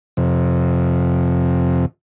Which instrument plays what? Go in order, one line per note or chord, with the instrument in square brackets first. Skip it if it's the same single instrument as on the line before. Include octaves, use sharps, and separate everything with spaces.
[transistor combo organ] F2 C3